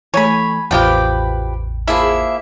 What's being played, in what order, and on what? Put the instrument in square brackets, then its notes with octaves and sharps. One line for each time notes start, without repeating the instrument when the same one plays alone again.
[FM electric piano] E3 A3 [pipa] C#5 [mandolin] G#5 B5
[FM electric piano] A1 E2 [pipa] B2 F3 G4 [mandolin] B4 G5
[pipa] F3 E4 [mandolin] A#3 G#4 E5